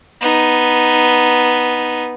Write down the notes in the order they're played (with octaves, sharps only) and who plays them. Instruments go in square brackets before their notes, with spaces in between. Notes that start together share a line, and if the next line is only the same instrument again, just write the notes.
[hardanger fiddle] B3 D#4